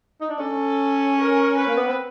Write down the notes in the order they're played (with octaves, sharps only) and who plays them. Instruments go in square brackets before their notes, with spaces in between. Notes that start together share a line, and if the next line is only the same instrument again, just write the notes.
[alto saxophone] D#4
D4
[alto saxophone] C#4 [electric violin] A4
[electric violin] A#4
B4
[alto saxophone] A#3
B3
C4